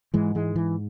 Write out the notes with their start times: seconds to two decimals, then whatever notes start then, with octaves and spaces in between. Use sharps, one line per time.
0.14 G#2 E3 G#3
0.35 E3 G#3
0.56 E3